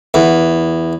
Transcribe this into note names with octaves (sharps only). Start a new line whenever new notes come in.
E2